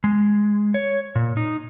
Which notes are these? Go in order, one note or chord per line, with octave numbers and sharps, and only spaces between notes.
G#3
C#5
A#2
D#4